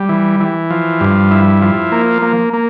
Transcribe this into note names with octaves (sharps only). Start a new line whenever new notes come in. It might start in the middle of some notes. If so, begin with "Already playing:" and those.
Already playing: G3
E3
E3
F3
G2
E4
F3
A#3
A#3
A#3